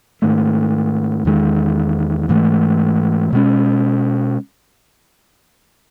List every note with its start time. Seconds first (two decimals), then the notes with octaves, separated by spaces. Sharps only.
0.22 G#2 D#3 A3
1.25 E2 D#3 G#3
2.29 G#2 E3 A3
3.33 B2 G#3 C#4